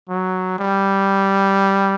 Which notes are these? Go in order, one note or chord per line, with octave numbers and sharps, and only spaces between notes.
F#3
G3